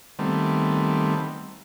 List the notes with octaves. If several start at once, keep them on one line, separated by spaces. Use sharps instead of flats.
D#3 G3 A3 B3 C4